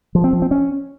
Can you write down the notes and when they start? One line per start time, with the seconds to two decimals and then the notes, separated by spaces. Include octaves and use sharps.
0.15 F3
0.24 C4
0.33 F3
0.42 C4
0.51 C#4